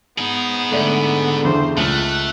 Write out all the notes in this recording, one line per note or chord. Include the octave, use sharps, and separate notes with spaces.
B3 D#4 G#4
G#2 D3 A3 A4 D5
E2 G2 C#3 C5
C#2 A3 F#6